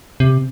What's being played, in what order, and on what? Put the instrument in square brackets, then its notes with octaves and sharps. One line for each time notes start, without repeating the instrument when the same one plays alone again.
[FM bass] C3